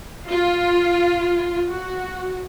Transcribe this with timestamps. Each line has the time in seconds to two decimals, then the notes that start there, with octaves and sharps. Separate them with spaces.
0.30 F4
1.69 F#4